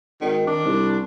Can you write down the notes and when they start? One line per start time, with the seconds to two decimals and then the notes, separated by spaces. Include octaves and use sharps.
0.21 G#1 D#3
0.47 D#3 D4
0.65 C2